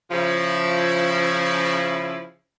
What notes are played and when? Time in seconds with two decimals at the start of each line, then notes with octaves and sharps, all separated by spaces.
0.11 C#3 F3 E4